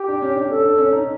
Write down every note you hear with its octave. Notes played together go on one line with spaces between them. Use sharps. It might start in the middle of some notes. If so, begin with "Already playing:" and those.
Already playing: G4
D4
C#4
D4
C#4 A4
D4
C#4
D#4